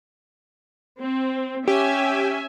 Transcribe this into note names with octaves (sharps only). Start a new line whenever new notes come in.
C4
C#4 G4 E5 G#5